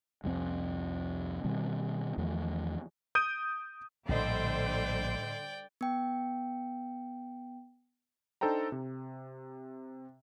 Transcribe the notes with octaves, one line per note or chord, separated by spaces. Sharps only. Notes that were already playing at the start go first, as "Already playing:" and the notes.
C2 F2 G3 C4
B2 D#3 G3 C4
E2 D#3 F3 A3
D#6 G6 D7 D#7
A#1 A2 D3 G3 C5 D5 D#5 G5
B3 G5
D4 D#4 A4 C5 G5 A#5
C3